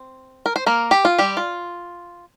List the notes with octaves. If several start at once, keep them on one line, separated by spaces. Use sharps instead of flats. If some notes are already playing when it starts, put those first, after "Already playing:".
Already playing: C4
A#4
C5
A#3 A#4
G4
F4
G3 G4
F4